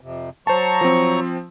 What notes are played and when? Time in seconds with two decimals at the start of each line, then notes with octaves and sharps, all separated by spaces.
0.01 F2 C3
0.47 F#3 C5 A5 A#5 C#6
0.81 F3 C4